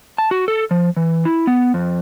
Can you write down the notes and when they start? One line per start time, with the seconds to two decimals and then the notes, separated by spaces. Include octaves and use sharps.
0.18 A5
0.31 F#4
0.48 A4
0.71 F3
0.97 E3
1.25 E4
1.47 B3
1.74 F2